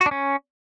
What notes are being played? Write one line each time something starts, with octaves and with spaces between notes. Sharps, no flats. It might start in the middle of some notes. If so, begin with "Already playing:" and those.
F#4
D4
C#4